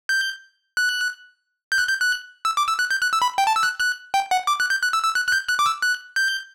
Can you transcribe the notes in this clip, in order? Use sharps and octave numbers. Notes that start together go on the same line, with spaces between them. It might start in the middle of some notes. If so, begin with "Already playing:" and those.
G6
F#6
G6
F#6
G6
F#6
E6
D6
E6
F#6
G6
F#6
E6
B5
G5
A5
E6
F#6
F#6
G5
F#5
D6
F#6
G6
F#6
E6
E6
F#6
F#6
G6
F#6
D6
E6
F#6
G6